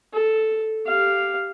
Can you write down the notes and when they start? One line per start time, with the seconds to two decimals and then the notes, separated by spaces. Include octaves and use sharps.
0.13 A4
0.87 G4 F5